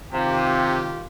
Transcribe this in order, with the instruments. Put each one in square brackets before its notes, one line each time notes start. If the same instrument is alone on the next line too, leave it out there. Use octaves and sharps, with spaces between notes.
[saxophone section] C3 [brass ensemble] D#3 F4 G4